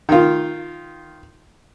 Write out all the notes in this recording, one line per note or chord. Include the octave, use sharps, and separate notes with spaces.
D#3 F4